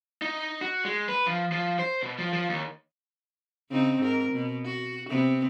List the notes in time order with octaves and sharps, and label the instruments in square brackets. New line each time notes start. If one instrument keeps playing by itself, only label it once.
[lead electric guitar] D#4
F#4
G#3
B4
F3
F3
C5
B2
F3
F3
D#2
[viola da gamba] C#3 C4 D#4
G#2 A#4
B2
F#4
C3 B3 C4